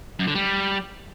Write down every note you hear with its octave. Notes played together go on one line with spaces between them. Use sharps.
F#2
D3
G3